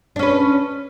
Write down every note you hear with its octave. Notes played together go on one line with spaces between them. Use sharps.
C#4 D4 B4